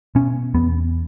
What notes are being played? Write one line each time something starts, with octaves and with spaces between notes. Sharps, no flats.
B2 C#4
E2 B3